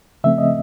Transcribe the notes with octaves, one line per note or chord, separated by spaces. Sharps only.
C#3 F3 A3 C4 E5
D#5